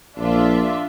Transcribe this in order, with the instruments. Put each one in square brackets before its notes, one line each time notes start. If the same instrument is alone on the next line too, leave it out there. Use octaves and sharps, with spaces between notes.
[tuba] A#1 [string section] D4 F4 E5